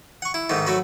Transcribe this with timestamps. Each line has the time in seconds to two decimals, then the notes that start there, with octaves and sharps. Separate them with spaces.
0.22 F#5 C#6
0.34 E4
0.49 G#2 D#3 A3
0.66 F#3 A3 F#4 B5